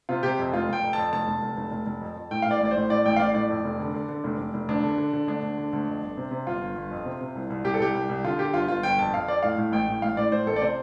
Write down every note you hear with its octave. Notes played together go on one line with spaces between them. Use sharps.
C3 F4
C3 G4
F2
F1 F4
F1 G5
F2
F2 A5
F1 A5
F1
F1
F1
F1
F1
F2
F2
A2 G5
F5
A2 D5
A1 D5
C5
A2
A2 D5
A1 G5
F5
A2 D5
A2 D5
F2
F1
D3
D3
D3
F1
F1
F1
D2 D4
D3
D3
D3
D2 D4
D2
D3
D2
F2
G1
C3
C3
G1 F4
G1
G1
F2
C3
C3
C2
C2
C2 G4
A4
C2 G4
C2
C2
D3 F4
D3 G4
G1 F4
G1 F4
G1 G5
F2 A5
F2 F5
F2 D5
A2 F5
A2
A1 G5
A2
A1 F5
A2 D5
A2 C5
A1 A4
D5
C3 C5